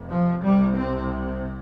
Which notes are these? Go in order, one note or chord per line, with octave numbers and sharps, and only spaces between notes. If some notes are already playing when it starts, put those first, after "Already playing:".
Already playing: F1 F2 C3
F3
C2 C3 G3
C4